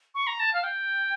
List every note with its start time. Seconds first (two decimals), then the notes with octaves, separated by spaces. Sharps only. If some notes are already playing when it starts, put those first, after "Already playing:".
0.15 C#6
0.27 A#5
0.40 A5
0.54 F5
0.64 G5